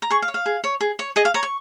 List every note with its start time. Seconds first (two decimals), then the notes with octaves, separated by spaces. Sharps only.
0.02 A#5
0.10 G#4 C#6
0.22 F5
0.28 C#5
0.34 F5
0.46 G#4
0.64 C#5
0.81 G#4
0.99 C#5
1.16 G#4 D#5
1.25 F5
1.34 C#5 A#5
1.43 C#6